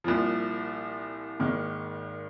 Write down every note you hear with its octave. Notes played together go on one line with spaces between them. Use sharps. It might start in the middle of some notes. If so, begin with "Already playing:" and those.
C2 A#2 F3
G#1 G#2 D#3 A#3